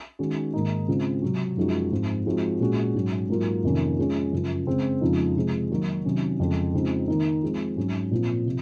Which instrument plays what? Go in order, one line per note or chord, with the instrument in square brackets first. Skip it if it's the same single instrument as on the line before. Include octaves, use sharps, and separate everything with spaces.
[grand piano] D#3 G#3 C#4 F#4
G#2 D#3 A#3 D#4
C#3 G#3 C4 F4
C3 F#3 C4 F#4
F#2 F3 G#3 D#4 F#4
G#2 F3 C4 F4
F3 G#3 C4 D#4 F#4
A#2 G#3 C#4 F#4
G#2 F#3 C#4 F#4
G#2 F#3 A#3 F4
F2 C3 D#3 A#3 C#4
F3 G#3 C#4
F#2 C#3 F3
C#3 G#3 C4
F2 C#3 F3 G#3 D#4
C3 F3 G#3
D#3 F#3 A#3 D#4 F#4
C3 D#3 F#3 C#4
F2 C#3 G#3
C#3 F3 G#3 C4 D#4
D#3 A#3 D#4
F3 G#3 C4
G#2 F#3 C#4
A#2 F3 C4 F4
C3 F3